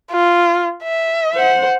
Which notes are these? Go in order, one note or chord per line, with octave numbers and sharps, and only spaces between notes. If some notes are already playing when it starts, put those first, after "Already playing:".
F4
E5
C5 F#5